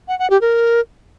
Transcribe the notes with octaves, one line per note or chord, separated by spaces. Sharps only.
F#5
F#5
G4
A#4